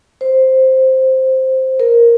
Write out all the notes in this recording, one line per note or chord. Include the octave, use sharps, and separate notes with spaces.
C5
A#4